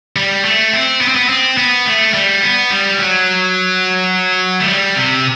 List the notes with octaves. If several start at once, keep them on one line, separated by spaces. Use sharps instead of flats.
G3
A3
C4
B3
C4
B3
C4
B3
A3
G3
B3
G3
F#3
A3
G3
C3